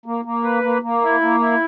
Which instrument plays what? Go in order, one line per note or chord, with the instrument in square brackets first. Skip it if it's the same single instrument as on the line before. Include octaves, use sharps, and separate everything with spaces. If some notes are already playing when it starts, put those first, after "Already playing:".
[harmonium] A#3
A#3
B4
A#3
A#3
E4
A#3
E4